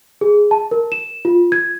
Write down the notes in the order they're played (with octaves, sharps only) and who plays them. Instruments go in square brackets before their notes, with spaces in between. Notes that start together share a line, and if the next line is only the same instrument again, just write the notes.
[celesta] G#4
A5
A#4
E7
F4
G#6